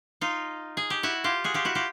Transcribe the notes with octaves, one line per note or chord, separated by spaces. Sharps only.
D#4 F4
G#4
G4
E4 F#4
F4 G4
F#4 G#4
F4 G4
E4 F#4
F4 G4